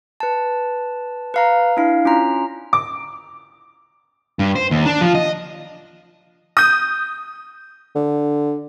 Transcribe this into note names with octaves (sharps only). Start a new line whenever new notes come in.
B4 A5
B4 F5 A#5
D4 E4 F5
C#4 F4 A#5
D6
G2
C5
D#2
D4
F3
D#5
D#6 G6
D3